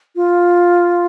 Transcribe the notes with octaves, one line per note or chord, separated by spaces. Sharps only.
F4